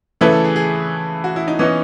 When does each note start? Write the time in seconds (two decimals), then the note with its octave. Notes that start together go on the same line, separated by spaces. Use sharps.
0.21 C#3 E3 A3 E4 A4 B4
0.32 A4
0.44 G#4
0.56 G#4
1.24 F#4
1.36 E4
1.48 D#4
1.59 E3 B3 C#4 D#4